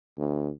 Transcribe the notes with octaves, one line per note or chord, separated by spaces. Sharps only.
D2